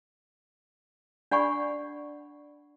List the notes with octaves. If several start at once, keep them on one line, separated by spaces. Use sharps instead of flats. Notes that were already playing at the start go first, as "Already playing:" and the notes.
D4 D5 F#5 G#5 B5 C#6